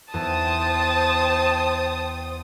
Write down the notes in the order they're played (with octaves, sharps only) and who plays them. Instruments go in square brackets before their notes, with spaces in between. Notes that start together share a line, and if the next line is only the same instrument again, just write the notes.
[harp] E2 [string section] C5 G5 D#6 [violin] A5